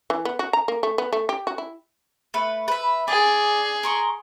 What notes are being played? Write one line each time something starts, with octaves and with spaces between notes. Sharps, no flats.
E3
B3
F#4
A#5
A#3
A3
B3
A3
G4
F#4
E4
A3 B4
B4 E5
G#4 D5
A#4 C6 C#6